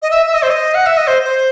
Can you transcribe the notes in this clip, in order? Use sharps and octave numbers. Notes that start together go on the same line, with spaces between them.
D#5
E5
E5
D#5
C5
D#5
F#5
E5
D#5
C5
C5